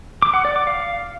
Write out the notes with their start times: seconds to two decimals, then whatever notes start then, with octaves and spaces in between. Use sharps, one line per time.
0.22 D6
0.34 F#5
0.45 D5
0.56 D6
0.67 F5